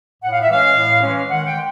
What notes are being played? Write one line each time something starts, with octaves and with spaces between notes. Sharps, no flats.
A2 F#5
F5
E5
E3 G#3 C#4 F5
A2
E3 G#3 C#4
D#3 F#5
G5
G#3